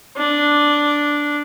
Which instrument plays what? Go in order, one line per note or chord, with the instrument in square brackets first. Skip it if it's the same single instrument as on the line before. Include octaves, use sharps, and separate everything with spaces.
[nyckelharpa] D4